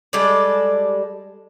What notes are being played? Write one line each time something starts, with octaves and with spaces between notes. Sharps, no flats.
G3 G#3 A4 D5